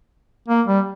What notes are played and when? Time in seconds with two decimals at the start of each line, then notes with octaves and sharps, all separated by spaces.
0.49 A#3
0.67 G3